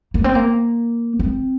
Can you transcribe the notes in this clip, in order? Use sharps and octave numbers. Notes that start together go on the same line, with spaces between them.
A#3
C4
A#3
C4